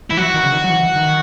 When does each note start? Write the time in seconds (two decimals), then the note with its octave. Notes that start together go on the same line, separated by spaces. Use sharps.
0.11 E3 E4
0.17 F#3 F#4
0.34 D#3
0.44 C#3
0.52 D#3
0.64 F#3
0.70 E3
0.96 D#3